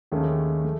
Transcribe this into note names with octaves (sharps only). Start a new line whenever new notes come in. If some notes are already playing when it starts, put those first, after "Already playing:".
D#2 D#3 A3 C#4 G#4
A3